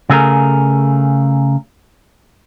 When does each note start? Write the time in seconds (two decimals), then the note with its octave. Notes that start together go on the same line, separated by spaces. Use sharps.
0.09 C#3 A3 G#4 A#4